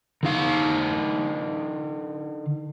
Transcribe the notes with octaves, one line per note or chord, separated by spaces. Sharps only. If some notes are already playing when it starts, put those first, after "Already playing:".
D3 D#4 F5